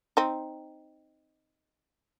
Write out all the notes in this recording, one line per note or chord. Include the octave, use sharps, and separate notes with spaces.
C4 D#4